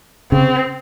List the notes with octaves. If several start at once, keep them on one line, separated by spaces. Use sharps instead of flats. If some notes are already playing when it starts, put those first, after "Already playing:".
C#3 C4